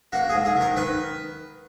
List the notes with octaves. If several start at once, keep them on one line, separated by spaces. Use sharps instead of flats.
A#3 F#4
G#4
G#2
G#4
D#3
A#4
D#3 B4